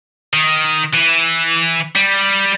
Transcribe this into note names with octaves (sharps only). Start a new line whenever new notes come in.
D#3
E3
G3